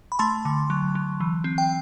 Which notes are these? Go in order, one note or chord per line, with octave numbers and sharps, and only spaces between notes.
B5
A3 A5 C6
D3
F#3
F#3
E3
C4
G5